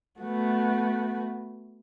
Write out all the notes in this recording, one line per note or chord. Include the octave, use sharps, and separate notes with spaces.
A3 B3 F#4